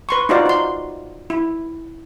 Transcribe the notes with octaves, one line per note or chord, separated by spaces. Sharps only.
B4 C6 C#6
D#4 F4 F#4 C5 D5 F5
D#4 C6
E4